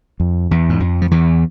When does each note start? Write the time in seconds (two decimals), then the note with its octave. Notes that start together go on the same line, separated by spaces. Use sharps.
0.20 F2
0.51 E2
0.69 G#2
0.80 F2
1.02 F3
1.11 E2 E3